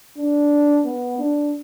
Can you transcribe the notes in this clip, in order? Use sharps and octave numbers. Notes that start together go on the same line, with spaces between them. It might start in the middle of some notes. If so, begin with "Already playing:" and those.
D4
B3
D4